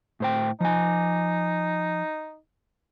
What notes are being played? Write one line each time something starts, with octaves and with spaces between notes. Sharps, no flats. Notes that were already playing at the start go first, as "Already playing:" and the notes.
A2 C5 G5
F3 D#4 G#5